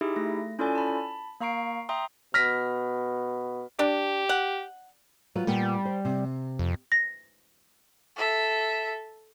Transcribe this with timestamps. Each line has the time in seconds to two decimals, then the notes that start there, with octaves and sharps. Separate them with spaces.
0.01 D#4 E4 G4 G#4 E5
0.16 A3 A#6
0.59 C#4 E4 F4 A4 D5 G#5
0.75 A5 B5
1.40 A#3 F5 A#5 C#6 C7 D7
1.89 E5 G5 A#5 C6 D#6
2.34 B2 F6 A#6 B6
3.79 D4 G4
4.29 F#5
5.35 F#3 F4 B4
5.47 A#2 G3 B3 G5
5.85 C5
6.05 C3
6.59 F2
6.92 A#6
8.16 A4 E5